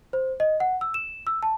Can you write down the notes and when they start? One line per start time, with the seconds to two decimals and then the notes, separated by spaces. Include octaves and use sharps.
0.13 C5
0.40 D#5
0.60 F#5
0.81 E6
0.94 E7
1.27 E6
1.43 A5